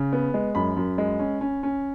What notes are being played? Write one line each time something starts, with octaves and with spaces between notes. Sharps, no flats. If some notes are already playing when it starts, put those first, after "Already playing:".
Already playing: C#3
B3
G#3
F#2 B5
F#2
G#3
C#4
C#4
C#4